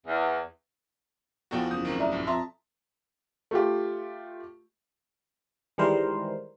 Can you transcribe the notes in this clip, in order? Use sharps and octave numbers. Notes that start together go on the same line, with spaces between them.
E2
E2 B2 F3 F#4 A4 G5
F#1 D#6 G6
F#1 D#3 A#3 C4
A3 D5 E5 A#5
A#1 G2
F2 E5 A5 A#5 C6
A3 F4 G4
D#3 E3 G3 G#3 A#4 C5